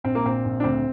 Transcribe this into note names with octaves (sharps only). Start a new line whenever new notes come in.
A#1 C4
A#3
A#2 C4
A#1
D4
D2 C4